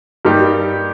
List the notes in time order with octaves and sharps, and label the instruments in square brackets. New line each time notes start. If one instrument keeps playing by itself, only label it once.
[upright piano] G2 G3 A#3 D#4 G4